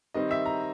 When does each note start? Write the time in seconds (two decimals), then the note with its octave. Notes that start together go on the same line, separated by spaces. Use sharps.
0.14 D#3 G3 C4 D#5
0.31 E5
0.46 A#5